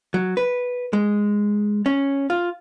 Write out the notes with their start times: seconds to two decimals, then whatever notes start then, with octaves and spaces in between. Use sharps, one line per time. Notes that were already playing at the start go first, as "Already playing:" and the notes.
0.14 F#3
0.37 B4
0.93 G#3
1.86 C#4
2.30 F4